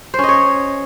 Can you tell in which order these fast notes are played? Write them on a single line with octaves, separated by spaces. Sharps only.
C5 C#4 D#5 C#5